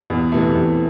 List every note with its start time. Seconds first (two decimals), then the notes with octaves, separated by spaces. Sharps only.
0.10 E2
0.32 C3 E3 A3
0.55 E2